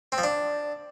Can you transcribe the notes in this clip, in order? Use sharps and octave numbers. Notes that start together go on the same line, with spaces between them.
C4
F3
D4